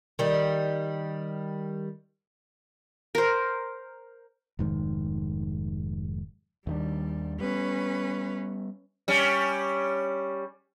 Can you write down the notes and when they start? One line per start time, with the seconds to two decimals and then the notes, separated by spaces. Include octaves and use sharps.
0.19 D#3 G3
3.15 A#4 C5
4.59 F1 G#2 D#3
6.67 D#2 D#3 G3 D4
7.40 G3 B3 C#4 B4
9.08 G3 C#4